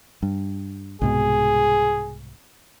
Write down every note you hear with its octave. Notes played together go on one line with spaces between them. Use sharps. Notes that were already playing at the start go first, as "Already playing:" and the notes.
G2
C2 G#2 B2 G#4